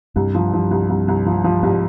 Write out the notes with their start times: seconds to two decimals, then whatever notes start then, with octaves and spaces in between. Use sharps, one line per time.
0.16 C2 G2
0.35 F3
0.53 F3
0.71 C2
0.90 C2
1.08 C2
1.26 F3
1.44 F3
1.63 C2 G#2